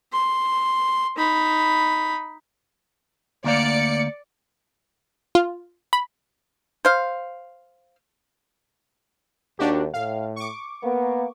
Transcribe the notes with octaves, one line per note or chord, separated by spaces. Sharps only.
C6
D#4 B5
D2 A#3 D5 F5 C#7
F4
B5
C5 F5
D#2 D4 F#4 G4
A2 F5
C#6 D6
A#3 B3